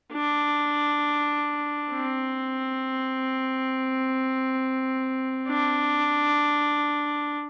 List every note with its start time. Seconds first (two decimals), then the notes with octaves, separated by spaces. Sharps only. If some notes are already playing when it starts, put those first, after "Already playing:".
0.13 D4
1.92 C4
5.48 D4